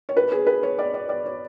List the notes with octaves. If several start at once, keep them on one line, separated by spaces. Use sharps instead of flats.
C#5
B4
G#4
B4
C#5
D5
D5
D5
C#5